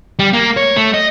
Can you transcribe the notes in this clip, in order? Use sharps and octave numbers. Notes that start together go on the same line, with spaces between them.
G3
A#3
C#5
A3
D#5